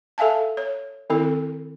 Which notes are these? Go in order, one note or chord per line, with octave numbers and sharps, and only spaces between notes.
A4 E5 F5 G#5 A5
C#5
D#3 C4 E4 A4